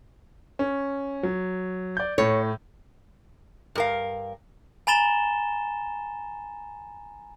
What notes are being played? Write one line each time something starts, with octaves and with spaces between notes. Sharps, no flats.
C#4
F#3
D5 G6
A2 C#5
G2 A#4 F5
G#5 A#5 B5 A6 E7 G7